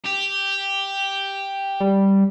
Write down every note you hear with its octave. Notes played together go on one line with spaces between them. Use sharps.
G4
G3